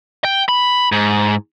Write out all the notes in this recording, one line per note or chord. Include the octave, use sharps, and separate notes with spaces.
G5
B5
G#2